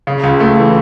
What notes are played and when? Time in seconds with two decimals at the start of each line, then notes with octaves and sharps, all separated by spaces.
0.07 C#3
0.23 C#2
0.40 A3
0.57 E3